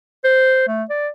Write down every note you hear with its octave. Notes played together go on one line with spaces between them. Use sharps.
C5
A3
D5